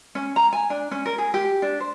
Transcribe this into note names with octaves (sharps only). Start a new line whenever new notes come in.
C#4
A#5
G#5
D4
C#4
A#4
G#4
G4
D4
C5